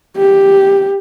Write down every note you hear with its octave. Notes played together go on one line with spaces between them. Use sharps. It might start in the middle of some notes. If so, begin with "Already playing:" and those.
G4